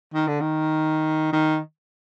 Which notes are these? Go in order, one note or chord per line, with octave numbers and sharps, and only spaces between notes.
D#3
D3
D#3
D#3